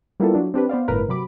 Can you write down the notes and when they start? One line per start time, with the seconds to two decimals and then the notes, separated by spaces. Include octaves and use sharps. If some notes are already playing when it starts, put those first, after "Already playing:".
0.20 G3 A#3 B3 E4 F4 A4
0.35 F#3 D4
0.54 C4 D4 G4 B4
0.69 B3 C5 D5 F5
0.88 G1 A2 A#4 B4
1.09 C3 F#3 B5 D6